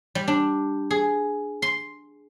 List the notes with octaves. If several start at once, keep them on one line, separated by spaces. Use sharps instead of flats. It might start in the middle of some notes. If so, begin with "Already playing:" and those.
G3
D4
G#4
C6